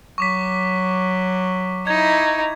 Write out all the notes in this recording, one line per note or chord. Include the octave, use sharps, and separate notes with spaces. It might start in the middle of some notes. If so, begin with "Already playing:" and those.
F#3 C#6 D6 B6
D#4 E4 G#6